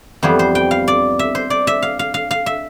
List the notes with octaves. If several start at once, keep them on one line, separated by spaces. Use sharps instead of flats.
F2 E3 G3 B3 C5
C5
G5
F5
D5
E5
C5
D5
E5
F5
F5
F5
F5
E5